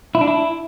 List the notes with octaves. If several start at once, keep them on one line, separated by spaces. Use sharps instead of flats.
E4
D4
E4